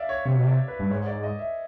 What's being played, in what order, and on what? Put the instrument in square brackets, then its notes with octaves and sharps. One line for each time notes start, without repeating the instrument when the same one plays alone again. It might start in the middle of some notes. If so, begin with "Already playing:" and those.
Already playing: [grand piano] D5 E5 F5
C#5
[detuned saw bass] C3 [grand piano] C#5
[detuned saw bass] B2
[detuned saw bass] C3 [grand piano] D5
[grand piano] B4
[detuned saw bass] G2
[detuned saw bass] G#2 [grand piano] C#5
[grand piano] D5
D#5
E5